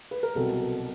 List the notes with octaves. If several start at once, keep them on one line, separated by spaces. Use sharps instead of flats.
B4
A#4
C2 B2 F#3 A4